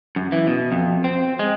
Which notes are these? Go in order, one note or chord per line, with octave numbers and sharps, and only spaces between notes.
F#2
E3
B2
F2
C4
G#3